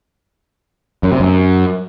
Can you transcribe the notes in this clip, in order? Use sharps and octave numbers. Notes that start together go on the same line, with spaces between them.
F#2
C3
F#2